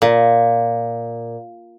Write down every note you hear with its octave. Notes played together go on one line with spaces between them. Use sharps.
A#2